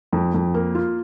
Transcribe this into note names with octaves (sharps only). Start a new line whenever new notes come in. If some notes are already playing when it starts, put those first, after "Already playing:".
F2
F2
A#3
F4